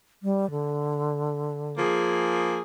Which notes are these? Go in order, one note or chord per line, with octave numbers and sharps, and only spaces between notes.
G3
D3
F3 A#3 G#4